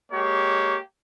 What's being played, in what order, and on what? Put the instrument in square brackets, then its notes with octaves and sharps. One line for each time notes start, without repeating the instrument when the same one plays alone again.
[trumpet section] G#3 A#3 G4 C#5